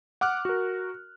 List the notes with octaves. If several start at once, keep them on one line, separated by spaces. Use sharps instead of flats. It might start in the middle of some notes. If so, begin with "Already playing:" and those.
F#5 D6 F6 F#6
F#4 A#4